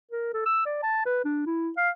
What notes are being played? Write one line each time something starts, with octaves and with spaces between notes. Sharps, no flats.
A#4
A4
E6
D5
A5
B4
D4
E4
F5